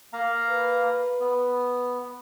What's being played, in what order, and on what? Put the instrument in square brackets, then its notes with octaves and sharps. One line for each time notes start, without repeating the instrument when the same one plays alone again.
[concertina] A#3 F5 A#5
[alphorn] B4
[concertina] B3